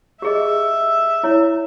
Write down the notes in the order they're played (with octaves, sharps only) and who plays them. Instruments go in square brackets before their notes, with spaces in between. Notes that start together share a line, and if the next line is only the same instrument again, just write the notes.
[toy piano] G4 G#4 D#5 [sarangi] E5
[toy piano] E4 C#5